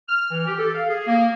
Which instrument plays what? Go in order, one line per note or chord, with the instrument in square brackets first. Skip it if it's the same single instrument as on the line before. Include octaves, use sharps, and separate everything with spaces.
[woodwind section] F6
E3
G4
A4
F5
G#4
A#3